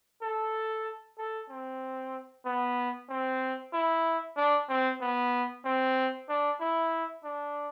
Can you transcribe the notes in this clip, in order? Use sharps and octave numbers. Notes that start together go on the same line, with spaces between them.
A4
A4
C4
B3
C4
E4
D4
C4
B3
C4
D4
E4
D4